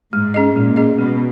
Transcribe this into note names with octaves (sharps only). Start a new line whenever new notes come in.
G#2 G#3
C#4 G#4 D#5
A#2 G#3
C#4 G#4 D#5
B2 G#3